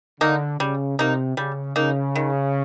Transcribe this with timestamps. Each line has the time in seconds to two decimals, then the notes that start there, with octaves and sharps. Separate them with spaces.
0.21 D3 A#3 D#4
0.59 C#3 G3
0.98 C3 A#3 D#4
1.37 C#3 G3
1.76 C#3 A#3 D#4
2.16 D#3